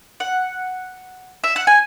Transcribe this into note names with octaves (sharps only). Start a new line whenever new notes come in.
F#5
E5
F#5
G#5